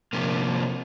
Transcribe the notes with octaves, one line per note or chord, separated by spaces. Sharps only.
C3 F3 A#3